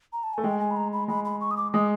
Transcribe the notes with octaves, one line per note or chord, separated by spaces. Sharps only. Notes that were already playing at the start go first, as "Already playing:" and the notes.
A#5
A5
A3 G#5
G#3 G5
G#5
B5
A#5
B5
G#3 B5
B5
C#6
D#6
D6
G#3 D#6